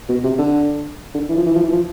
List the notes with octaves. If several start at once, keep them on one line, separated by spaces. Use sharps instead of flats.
B2
C3
D3
D3
E3
F3
E3
F3
E3
F3